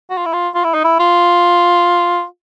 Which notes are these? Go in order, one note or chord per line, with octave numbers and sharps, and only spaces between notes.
F#4
F4
E4
F4
F4
E4
D#4
E4
F4